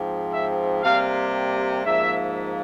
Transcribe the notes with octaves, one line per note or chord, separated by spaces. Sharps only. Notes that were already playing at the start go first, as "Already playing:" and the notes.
Already playing: G#2 F3 C4
E5
C3 G3 A#3 F5
G#2 F3 A#3 E5